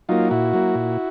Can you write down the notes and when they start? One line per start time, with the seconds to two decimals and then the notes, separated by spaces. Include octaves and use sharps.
0.09 F#3 A#3 D#4 F4
0.31 A#2 E4 F#4
0.53 F#3 A#3
0.75 A#2